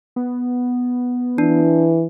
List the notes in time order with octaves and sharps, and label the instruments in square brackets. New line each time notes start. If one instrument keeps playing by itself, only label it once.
[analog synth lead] B3
[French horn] E3 [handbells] D4